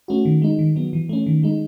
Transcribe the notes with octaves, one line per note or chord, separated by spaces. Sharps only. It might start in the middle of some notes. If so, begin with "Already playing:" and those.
A3 C#4 F#4
D#3
G#3 D#4
D#3
F#3 B3
E3
A3 C#4
D#3
G#3 D#4